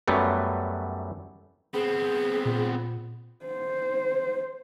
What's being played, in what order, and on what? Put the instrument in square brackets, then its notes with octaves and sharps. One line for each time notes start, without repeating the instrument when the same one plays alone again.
[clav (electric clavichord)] F#2 F#3 G3 A3 B3
[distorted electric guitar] B3 C4 [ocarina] G#4
[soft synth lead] A#2
[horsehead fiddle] C5